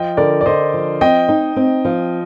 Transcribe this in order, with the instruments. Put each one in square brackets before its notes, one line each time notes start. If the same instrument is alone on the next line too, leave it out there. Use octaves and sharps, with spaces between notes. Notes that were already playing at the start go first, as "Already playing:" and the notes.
Already playing: [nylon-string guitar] F3 [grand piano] D#5 G5
[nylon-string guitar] D3 [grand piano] A#4 D5
[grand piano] D5
[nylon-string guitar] D3 [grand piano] C5 D#5
[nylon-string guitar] F3
[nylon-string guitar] C4 [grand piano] D#5 G5
[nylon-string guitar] D#4
C4
F3